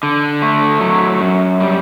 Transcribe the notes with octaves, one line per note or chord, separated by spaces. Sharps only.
D3
A3
F#3
F#2
G3